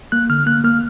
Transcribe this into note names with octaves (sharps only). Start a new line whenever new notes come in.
A#3 F#6
D3 F6
A#3 F#6
A#3 F6